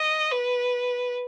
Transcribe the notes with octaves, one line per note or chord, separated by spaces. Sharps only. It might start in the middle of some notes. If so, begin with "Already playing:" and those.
Already playing: D#5
B4